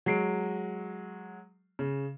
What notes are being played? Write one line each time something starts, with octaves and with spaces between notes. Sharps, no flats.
F#3 G#3 C7 D7
C#3